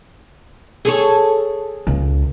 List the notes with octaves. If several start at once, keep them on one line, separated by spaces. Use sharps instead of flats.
G#4 A4 C#5
C#2